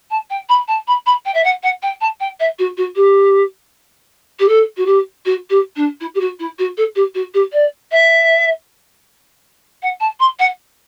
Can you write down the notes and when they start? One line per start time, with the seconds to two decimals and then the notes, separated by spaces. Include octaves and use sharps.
0.10 A5
0.30 G5
0.49 B5
0.68 A5
0.87 B5
1.06 B5
1.25 G5
1.34 E5
1.44 F#5
1.63 F#5
1.82 G5
2.01 A5
2.20 G5
2.40 E5
2.59 F#4
2.77 F#4
2.96 G4
4.39 G4
4.48 A4
4.77 F#4
4.86 G4
5.25 F#4
5.50 G4
5.76 D4
6.00 E4
6.15 G4
6.20 F#4
6.39 E4
6.58 F#4
6.77 A4
6.95 G4
7.14 F#4
7.34 G4
7.52 D5
7.91 E5
9.82 F#5
10.00 A5
10.20 C6
10.39 F#5